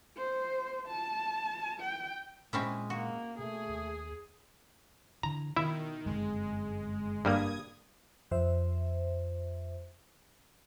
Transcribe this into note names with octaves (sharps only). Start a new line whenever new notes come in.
C5
A5
G5
A#2 G#3 C4 C#4 E4
A#3 F#4
B2 A3 G#4
D#2
D3 E3 A#5
B2 D#3 E4 E5
G1 F#2 C3 G#3
G2 G3 A#3 D#6 G#6
F2 C5 E5